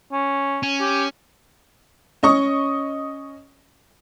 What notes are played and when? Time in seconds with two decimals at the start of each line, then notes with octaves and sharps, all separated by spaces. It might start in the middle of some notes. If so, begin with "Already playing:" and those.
0.12 C#4
0.63 C#4
0.80 G4
2.23 C#4 D#5 C#6 D#6